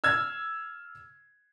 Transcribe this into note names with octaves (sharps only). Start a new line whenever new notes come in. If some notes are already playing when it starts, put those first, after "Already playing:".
E6 F6 G#6